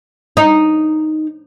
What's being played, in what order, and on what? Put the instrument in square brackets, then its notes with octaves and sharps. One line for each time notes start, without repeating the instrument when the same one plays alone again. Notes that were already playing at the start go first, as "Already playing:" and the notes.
[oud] D#4